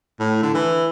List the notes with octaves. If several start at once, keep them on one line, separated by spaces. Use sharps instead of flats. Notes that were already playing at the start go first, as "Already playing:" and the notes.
A2
D3
E3